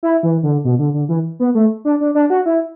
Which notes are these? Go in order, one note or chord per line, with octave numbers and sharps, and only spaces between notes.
E4
E3
D3
B2
D3
D3
E3
B3
A3
D4
D4
D4
F#4
E4